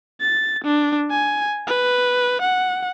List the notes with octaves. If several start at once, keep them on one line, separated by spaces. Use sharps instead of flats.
A6
D4
G#5
B4
F#5